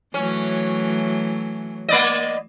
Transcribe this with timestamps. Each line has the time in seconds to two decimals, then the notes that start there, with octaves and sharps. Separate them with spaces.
0.14 E3 F#3 A3 C#4
1.89 A#3 D5 D#5